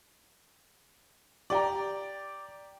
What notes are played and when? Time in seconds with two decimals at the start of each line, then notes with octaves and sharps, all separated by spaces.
1.50 G4 D5 G5 A#5